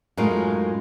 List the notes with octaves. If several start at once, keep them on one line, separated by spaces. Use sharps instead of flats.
F#2 A2 G#3 D#4 F4 A#4